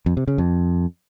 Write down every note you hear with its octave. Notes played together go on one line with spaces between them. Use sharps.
F2
C3
C#3
F2